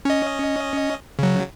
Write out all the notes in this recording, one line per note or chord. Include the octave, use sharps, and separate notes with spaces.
C#4 D#5
C#3 F#3